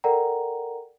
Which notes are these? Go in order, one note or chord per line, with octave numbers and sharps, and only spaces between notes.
A4 A#4 D5 F#5 G5 A#5